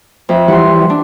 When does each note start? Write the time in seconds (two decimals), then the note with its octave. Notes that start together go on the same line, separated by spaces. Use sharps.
0.29 F2 E5
0.48 E3 G3 F#5 C6
0.90 D4